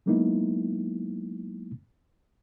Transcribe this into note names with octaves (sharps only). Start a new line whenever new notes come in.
F#3 G#3 A#3 B3 D#4 E4